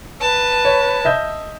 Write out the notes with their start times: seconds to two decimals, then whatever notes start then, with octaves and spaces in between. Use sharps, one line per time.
0.21 B4 A5
0.65 C#5
1.05 D#5 E5 G6